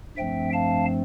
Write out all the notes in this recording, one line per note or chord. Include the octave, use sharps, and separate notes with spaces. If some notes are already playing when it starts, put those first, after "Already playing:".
G2 F3 A3 C4 E5 G5
F5 A5